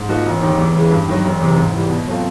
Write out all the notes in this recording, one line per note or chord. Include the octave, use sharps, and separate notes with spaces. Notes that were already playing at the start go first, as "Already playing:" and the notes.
Already playing: G#2
F3 A#3 D#4 F#4
E1
D#2 D#3
E2
C#3 E3 G#3
G2
D#3 F#3
E1
E2 C3
G#2
E3 G3
B2
F#3 A3 C4 F4